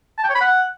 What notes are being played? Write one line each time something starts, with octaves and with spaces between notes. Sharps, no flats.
A5
G5
C#5
B5
F#5